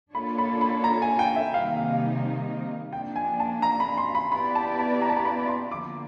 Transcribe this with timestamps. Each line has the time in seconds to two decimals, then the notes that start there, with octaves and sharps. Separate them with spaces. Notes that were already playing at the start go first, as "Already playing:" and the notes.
0.15 A#3 D4 F4 A4 C#5 B5
0.38 B5
0.61 B5
0.84 A#5
1.02 G#5
1.19 G5
1.36 E5
1.54 C3 D#3 G3 A#3 D#4 F5
1.77 F5
2.93 F3 A#3 D4 G5
3.16 G#5
3.40 A5
3.62 A#5
3.80 B5
3.98 C6
4.15 B5
4.32 B3 E4 G4 B4 D5 B5
4.55 A5
4.79 A5
5.02 A#5
5.10 A5
5.17 A#5
5.25 B5
5.47 C6
5.71 D3 F3 A#3 D6